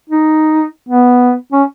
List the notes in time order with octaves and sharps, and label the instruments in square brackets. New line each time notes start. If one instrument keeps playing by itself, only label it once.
[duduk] D#4
B3
C#4